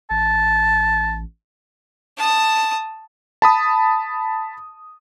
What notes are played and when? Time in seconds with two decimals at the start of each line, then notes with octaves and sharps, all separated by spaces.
0.11 A1 A5
2.17 A5 D#6
3.42 A5 B5 D#6